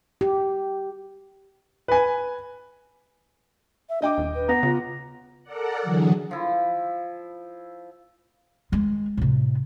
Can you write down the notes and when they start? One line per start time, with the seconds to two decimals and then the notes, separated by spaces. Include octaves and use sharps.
0.21 G4
1.88 B4 G#5
3.89 E5
4.02 D4 D#5 G5 D6
4.18 D#1
4.35 B4
4.49 B3 F#5 A#5
4.63 C#3 F4
5.43 A4 A#4 D5 F#5
5.81 D3 E3 F#3 G#4
6.31 F3 E4
8.72 D#3 G#3
9.17 A2 C3